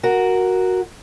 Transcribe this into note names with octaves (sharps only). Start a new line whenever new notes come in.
F#4 A#4